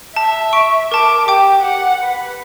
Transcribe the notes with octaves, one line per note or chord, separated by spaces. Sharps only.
E5 A5
C#6 D7
A#4 A5 D6
G4 G5 D6
F#5
B4